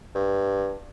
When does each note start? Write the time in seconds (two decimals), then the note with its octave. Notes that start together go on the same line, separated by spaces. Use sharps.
0.15 G2